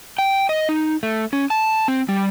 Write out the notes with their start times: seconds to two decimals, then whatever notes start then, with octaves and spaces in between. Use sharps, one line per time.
0.18 G5
0.49 D#5
0.69 D#4
1.03 A3
1.33 C#4
1.50 A5
1.88 C4
2.09 G3